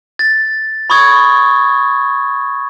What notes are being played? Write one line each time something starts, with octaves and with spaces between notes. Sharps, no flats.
A6
B5 C#6 D#6 G#6